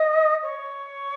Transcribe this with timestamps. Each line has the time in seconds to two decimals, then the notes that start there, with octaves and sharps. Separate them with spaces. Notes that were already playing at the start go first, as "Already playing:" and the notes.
Already playing: D#5
0.42 C#5